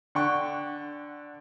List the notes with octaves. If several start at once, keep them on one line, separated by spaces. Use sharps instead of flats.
D3 F#5 G5 C#6 F#6